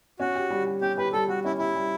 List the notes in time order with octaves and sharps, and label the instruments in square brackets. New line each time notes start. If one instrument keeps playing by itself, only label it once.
[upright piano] C#4 [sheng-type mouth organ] F#4
[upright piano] G4
G3
G3
[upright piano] C#4 [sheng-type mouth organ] G4
[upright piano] G4 [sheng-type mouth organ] B4
[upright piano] G3 [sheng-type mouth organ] A4
[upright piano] G3 [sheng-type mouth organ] F#4
[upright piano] C#4 [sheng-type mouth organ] E4
[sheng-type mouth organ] E4 [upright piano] G4
[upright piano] G3